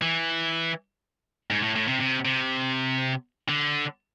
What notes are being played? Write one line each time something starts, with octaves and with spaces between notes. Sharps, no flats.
E3
G#2
A2
A2
C3
C3
C3
D3